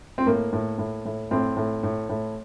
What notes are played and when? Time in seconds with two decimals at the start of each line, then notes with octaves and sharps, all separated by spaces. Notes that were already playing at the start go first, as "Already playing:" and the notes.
0.18 C4
0.26 A2 A#3
0.53 A2
0.78 A2
1.05 A2
1.31 A2 C4
1.57 A2
1.83 A2
2.09 A2